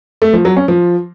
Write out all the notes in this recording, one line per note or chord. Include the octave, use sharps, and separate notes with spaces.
A3
F3
F#3
C#4
F3